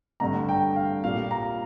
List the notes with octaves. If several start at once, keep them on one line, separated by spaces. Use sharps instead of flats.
G2 D3 A3 A#5
G5
F5
A#2 G3 A#3 F5
A#5